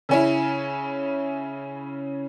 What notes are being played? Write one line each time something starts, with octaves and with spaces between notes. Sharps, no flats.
C#3 C#4 E4